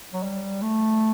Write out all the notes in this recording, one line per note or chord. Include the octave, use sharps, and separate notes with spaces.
F#3
G3
A3